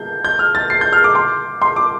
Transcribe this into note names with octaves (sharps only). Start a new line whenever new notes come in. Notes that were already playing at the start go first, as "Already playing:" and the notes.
Already playing: G6
G6
F6
A6
C7
G6
F6
D6
C6
C6
D6